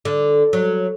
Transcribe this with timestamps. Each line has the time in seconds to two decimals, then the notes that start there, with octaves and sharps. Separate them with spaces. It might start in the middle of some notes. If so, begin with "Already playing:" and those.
0.05 D3
0.53 F#3